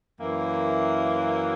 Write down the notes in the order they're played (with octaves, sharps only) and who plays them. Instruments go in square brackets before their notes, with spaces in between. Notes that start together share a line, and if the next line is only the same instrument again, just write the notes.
[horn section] F#2 E3 A#3